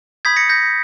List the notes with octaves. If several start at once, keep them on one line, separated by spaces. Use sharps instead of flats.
B5 D#6 G6 G#6 B6
A#6 C#7
G6 A#6